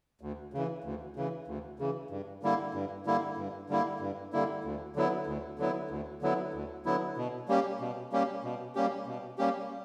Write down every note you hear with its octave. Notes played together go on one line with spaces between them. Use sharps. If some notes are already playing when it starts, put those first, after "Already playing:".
D2
C#3 E3
D2
C#3 E3
D2
C#3 E3
G2
D3 G3 A#3 E4
G2
D3 G3 A#3 E4
G2
D3 G3 A#3 E4
G2
D3 G3 A#3 E4
D2
D3 F#3 B3 E4
D2
D3 F#3 B3 E4
D2
D3 F#3 B3 E4
D2
D3 F#3 B3 E4
B2
G3 A#3 C#4 G4
B2
G3 A#3 C#4 G4
B2
G3 A#3 C#4 G4
B2
G3 A#3 C#4 G4